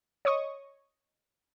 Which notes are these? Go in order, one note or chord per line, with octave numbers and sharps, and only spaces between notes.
C#5 D#5 C#6 D#6